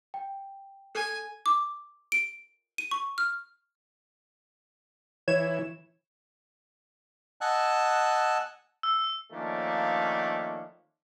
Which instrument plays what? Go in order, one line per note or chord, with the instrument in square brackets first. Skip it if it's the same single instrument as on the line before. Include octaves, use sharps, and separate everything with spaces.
[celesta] G5
[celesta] A4 [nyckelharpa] G#5
[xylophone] D6
D7
D#7
C#6
F6
[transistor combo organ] E3 [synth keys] C#5 G#6 E7
[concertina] D#5 F#5 G#5 A5 E6 F#6
[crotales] E6
[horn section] D#3 F3 A3 A#3 C#4 D4